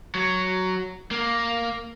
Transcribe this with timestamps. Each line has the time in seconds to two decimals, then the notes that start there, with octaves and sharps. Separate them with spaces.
0.15 F#3
1.11 A#3